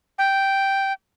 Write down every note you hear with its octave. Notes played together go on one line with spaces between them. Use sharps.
G5